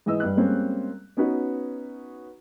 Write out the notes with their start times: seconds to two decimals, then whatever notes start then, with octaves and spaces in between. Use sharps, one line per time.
0.06 G#2 E3 D#5 E6
0.20 G2 F#6
0.36 G3 G#3 A#3 C4 C#4
1.17 B3 C#4 D#4 F#4 B4